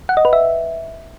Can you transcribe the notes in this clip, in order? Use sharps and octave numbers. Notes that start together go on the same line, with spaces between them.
F#5
D#5
B4
E5